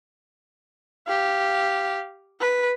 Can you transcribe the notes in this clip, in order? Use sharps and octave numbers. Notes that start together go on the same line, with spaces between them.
G4 F5
B4